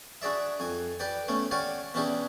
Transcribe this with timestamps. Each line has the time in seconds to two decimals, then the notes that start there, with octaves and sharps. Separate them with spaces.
0.22 D4 F#4 G#4 D5 E5
0.60 F2 G#5
1.00 G4 B4 D5 G5
1.28 A3 B3 C#4 C#5
1.51 G4 C#5 D5 F5 F#5 G#5
1.94 B2 C#4 D4 E4 G4 G#4